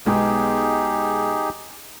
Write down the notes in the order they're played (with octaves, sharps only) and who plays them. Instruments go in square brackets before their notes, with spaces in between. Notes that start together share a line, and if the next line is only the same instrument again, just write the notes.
[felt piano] B1 G#3 B3 [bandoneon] D#4 G4 G#4